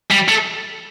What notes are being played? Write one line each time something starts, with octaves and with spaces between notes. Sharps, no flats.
G3
A3